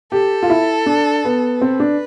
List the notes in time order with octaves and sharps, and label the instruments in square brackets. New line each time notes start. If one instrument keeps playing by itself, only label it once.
[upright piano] G4 [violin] A4
[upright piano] F4
E4
D4
B3
[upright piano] C4 [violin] B4
[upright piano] D4